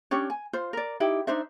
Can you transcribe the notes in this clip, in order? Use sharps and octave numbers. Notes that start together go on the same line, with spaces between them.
C#4 D4 G4 C#5
G#5
F4 C5
A#4 D5
D#4 E4 G4
D4 D#4 C5 E5